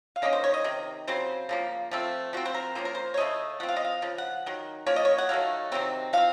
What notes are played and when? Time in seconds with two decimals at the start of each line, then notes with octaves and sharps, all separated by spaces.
0.16 F5
0.22 D#3 A#3 C#4 D#5
0.33 C5
0.44 C#5
0.54 D#5
0.64 C3 D#3
1.07 C#3 F#3 C4 C5
1.49 C#3 F3 A#3
1.91 F3 A3 C4
2.33 F3 C4 F#4
2.46 C5
2.54 A#4
2.75 F3 A#3 C#4 C5
2.85 A#4
2.95 C5
3.14 C#5
3.17 C#3 F3 A3 D#5
3.60 F3 C4 F#5
3.68 F5
3.76 D#5
3.85 F5
4.02 C#3 F3
4.18 F#5
4.46 D#3 F#3
4.86 F3 A#3 C#4 C#5
4.96 D#5
5.05 C#5
5.18 F#5
5.29 D#3 F#3 A3 F5
5.72 C3 D#3 F#3 C4
6.13 F3 C4 F5